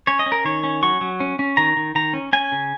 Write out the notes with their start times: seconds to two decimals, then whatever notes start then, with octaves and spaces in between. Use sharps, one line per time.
0.07 C#4 C#5
0.19 D#5
0.26 C#4
0.32 A#4
0.45 D#3 C#5
0.64 C#4
0.83 F#3 C#6
1.01 F#3
1.20 C#4
1.39 C#4
1.57 D#3 A#5
1.77 D#3
1.95 D#3 A#5
2.13 C#4
2.33 C#4 G#5
2.52 C#3